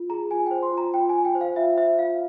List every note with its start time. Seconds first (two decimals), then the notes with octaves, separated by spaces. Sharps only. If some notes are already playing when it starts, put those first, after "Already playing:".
Already playing: F4
0.10 G#4 A#5
0.31 F4 G#5
0.46 C5 G5
0.63 C6
0.72 F4
0.77 A#5
0.94 F4 G5
1.09 G#5
1.15 F4
1.25 G5
1.35 C5
1.41 F5
1.56 F4 E5
1.77 C5 E5
1.98 F4 F5